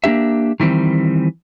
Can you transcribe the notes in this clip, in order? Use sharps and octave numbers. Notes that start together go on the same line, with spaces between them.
A#3 B3 D4 G4 E5
D#3 E3 G3 C4